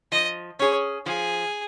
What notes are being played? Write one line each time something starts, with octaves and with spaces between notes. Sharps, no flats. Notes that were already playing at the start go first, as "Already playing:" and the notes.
F3 D#5
C#4 G#4 C#5
F3 G#4